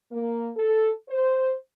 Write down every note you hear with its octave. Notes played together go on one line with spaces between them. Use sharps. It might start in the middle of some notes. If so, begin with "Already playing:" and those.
A#3
A4
C5